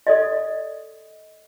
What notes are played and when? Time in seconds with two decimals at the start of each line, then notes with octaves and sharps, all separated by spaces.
0.07 A4 D5 D#5